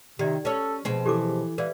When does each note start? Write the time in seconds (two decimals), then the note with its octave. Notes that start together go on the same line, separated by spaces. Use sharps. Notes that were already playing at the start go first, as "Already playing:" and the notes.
0.19 C3 D#3 G4 D5
0.45 C#4 A4 C#5
0.85 B2 F3 C4 G#4
1.06 E3 G4 A4 D6
1.58 E3 B4 D5 F5